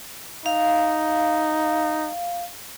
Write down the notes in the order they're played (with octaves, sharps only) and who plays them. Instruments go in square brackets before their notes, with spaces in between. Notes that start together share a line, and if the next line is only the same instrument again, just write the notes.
[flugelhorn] D#4 [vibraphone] F5